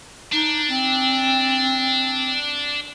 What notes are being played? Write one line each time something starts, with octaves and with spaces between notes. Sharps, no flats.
D4 D#4
C4